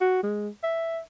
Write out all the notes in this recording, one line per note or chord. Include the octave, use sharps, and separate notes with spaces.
F#4
G#3
E5